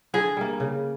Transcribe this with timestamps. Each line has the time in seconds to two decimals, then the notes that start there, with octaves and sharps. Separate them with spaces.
0.14 D3 G#4
0.37 G3 A#3
0.60 C#3